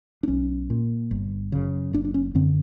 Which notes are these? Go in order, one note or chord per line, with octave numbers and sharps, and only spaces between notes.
D4
B1 C#4
A#2
G1
F#2 C#3
F#1 D4
D4
C#4
F#2 D3 C4